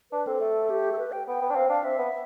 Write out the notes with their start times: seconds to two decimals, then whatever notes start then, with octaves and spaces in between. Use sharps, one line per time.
0.12 D4 B4
0.27 C4 A4
0.41 A3
0.70 G4
0.92 A4
0.98 B4
1.12 G5
1.28 B3 G5
1.42 B3
1.50 D4
1.55 C4 F5
1.69 D4 F5
1.84 C4 E5
1.99 B3